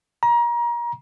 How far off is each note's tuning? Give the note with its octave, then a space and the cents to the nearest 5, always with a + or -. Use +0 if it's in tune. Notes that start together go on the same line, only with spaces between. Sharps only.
A#5 +30